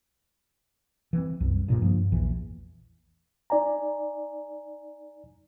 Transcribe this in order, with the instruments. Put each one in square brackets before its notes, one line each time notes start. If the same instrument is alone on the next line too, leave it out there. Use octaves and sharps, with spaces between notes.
[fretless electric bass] E3 B3 C4
C2 F#2
G2 A#2 C#3
G2 F3 A#3
A#1 E2 E3
[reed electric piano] D#4 D5 G#5 A#5